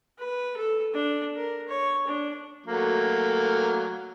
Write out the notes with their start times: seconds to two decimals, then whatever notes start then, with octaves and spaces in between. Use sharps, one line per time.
0.19 B4
0.57 A4
0.94 D4
1.36 A#4
1.68 C#5
2.07 D4
2.66 F#3 A3 A#3